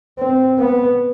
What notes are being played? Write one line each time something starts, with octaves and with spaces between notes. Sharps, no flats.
C4
B3